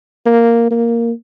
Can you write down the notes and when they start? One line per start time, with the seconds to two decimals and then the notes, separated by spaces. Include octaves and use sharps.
0.26 A#3
0.71 A#3